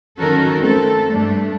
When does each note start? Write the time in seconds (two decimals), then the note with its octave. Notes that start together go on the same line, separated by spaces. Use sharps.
0.19 D#3 F#3 C#4 F#4 A4 A#4
0.58 A3 C4 A4
1.12 G2 A3 D4